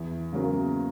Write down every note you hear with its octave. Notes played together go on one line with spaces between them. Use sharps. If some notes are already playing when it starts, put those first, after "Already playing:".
Already playing: E2
C#3 F#3 A#3